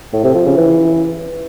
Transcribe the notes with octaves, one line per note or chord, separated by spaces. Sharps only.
A2
C3
F3
C#3
E3